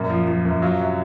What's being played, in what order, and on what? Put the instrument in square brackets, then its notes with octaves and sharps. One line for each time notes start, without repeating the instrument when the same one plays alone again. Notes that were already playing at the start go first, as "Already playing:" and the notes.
Already playing: [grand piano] F#2 A#2
F3
F3
F#2
F#3 F4
C3